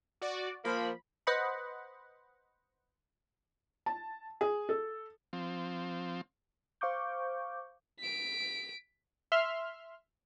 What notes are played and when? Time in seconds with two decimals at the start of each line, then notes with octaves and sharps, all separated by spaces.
0.22 F#4 D5
0.65 F3 A#3 B5
1.27 B4 C5 D#5 F#5 B5
3.86 A5
4.41 G#4
4.69 A4
5.33 F3 C4
6.81 C5 F5 C#6 D6 G6
8.00 B6 D7
9.32 E5 C6 F6